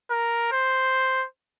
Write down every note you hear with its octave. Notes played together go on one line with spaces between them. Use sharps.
A#4
C5